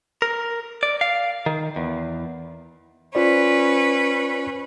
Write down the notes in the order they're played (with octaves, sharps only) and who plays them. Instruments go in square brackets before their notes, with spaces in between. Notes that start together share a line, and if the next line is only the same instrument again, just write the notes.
[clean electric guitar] A#4
D5
F5
D#3
E2
[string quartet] C#4 B4 [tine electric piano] F4 C5 D5